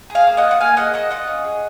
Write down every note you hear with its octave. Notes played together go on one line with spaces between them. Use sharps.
G#4
F5 G#5
A#3
D#5 F#5
F4
F#5
A#3 F5 G#5
G#4 D#5 F#5
A#3 D#5 F#5
F4 D#5 F#5
C#4
G#4